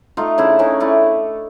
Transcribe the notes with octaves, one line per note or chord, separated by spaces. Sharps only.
A3 D#4 F4
C#3 D4 E4
C#3 C#4 D#4
A3 D4 E4